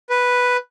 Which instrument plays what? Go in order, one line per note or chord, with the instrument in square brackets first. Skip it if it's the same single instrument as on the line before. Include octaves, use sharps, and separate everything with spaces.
[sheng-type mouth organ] B4